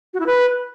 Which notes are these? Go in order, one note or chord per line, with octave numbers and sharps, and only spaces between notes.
F#4
E4
B4